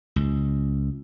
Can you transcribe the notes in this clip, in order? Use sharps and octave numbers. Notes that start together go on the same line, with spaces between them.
C#2